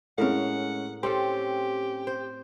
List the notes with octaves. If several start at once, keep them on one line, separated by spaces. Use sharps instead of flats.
A2 G#3 C#4 A#4 F5 F#5
C4 C#4 G4 A4 C6
C5